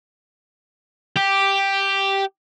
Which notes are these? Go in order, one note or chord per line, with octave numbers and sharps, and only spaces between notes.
G4